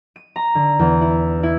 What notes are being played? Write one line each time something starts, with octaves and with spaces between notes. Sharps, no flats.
D#7
A#5
D3
E2
E4
E4